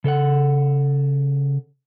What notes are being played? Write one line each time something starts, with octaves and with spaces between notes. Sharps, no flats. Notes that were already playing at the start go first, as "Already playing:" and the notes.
C#3 A4 C#5 F#5